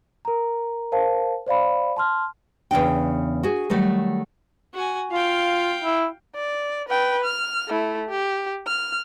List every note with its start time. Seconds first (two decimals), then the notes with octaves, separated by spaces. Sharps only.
0.25 A#4 A#5
0.92 A#4 C5 F5 A5
1.46 C5 D5 F5 B5
1.96 A5 C6 F6
2.71 E2 C#3 D4 G5
3.43 F#4 G#4
3.70 D#3 F#3 G3 A3
4.74 F#4 G#5
5.12 F4 F5 G5
5.84 E4
6.35 D5
6.89 B4 G5
7.25 F6
7.68 A3 E4
8.09 G4
8.67 F6